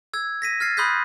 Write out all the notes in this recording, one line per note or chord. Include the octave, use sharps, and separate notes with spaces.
E6 G#6
A#6 B6 D#7
F6 G#6 A6 C7
B5 C6 D#6 F#6 G6 B6